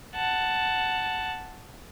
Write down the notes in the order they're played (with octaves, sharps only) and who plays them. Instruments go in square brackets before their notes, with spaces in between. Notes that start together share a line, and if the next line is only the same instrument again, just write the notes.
[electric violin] F#5 A5